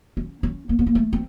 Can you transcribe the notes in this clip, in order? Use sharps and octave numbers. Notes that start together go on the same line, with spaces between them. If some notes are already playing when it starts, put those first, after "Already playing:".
C#4
C#4
A#3
B3
A#3
A3
C4